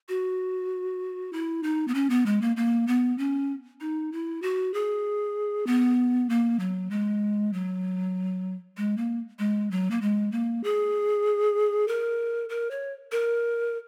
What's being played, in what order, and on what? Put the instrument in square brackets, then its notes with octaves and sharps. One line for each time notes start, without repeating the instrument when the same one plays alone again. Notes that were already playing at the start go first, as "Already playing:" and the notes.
[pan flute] F#4
E4
D#4
B3
C#4
B3
G#3
A#3
A#3
B3
C#4
D#4
E4
F#4
G#4
B3
A#3
F#3
G#3
F#3
G#3
A#3
G#3
F#3
A#3
G#3
A#3
G#4
A#4
A#4
C#5
A#4